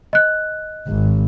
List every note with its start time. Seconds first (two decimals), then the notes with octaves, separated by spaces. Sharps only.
0.13 D#5 F#6
0.87 G#1